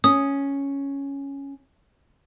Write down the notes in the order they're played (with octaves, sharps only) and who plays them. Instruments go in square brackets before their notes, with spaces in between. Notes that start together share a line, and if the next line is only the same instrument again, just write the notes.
[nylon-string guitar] C#4 [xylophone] D#6